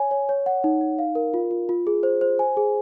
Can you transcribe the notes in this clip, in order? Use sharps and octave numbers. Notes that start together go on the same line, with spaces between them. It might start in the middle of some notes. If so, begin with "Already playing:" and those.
Already playing: C#5 G#5
C#5
C#5
F#5
D#4
D#4
F5
A#4
F4
F4
F4
G#4
C5
C5
G#5
G#4